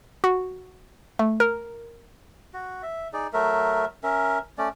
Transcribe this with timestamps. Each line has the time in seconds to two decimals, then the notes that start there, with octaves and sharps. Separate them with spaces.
0.24 F#4
1.19 A3
1.40 A#4
2.53 F#4
2.83 E5
3.13 D#4 G#4 D5
3.33 F#3 A3 A#4 E5
4.03 C#4 A#4 E5
4.58 A3 C#4 D5